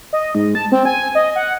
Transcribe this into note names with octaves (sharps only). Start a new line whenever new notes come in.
D#5
G#2
A5
C4
G#5
D#5
F#5